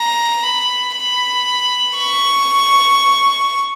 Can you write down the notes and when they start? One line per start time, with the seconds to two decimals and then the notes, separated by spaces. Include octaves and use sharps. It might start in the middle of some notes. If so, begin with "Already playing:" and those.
Already playing: A#5
0.43 B5
0.95 B5
1.98 C#6